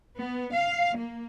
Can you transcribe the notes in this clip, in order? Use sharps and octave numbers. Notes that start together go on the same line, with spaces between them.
B3
F5
A#3